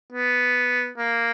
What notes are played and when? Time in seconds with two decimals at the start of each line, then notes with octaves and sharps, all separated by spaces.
0.13 B3
0.98 A#3